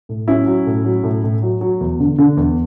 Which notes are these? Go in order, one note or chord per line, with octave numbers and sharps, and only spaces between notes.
A2
F#3 C#4 E4
F#3
A2
F#3
A2
A2
F#3
F#3
E2
D3
D3
E2